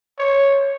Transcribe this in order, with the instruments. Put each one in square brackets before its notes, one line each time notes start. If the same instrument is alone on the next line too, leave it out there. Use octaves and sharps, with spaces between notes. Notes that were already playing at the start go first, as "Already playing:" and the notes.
[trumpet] C#5